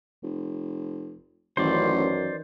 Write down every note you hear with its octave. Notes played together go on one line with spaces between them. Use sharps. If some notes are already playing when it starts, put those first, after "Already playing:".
F1
A1 F#2 D#3 E3 C5 D5